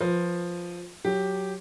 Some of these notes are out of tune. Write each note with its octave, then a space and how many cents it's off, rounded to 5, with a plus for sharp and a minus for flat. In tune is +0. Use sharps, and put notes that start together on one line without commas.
F3 +5 B4 +0
F#3 +0 G4 +0